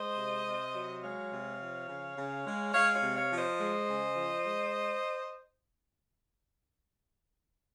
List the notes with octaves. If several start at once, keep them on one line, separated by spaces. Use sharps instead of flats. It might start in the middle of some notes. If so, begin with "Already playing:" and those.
Already playing: G#3 C5 D#5
C3
C3
F#3
G#3 C#5 F5
C3
F3
C#3
C#3
G#3
G#3 C#5 F5
C#5 F5
C3
C#5 F5
F3
C5 D#5
G#3
C#3
F3
G#3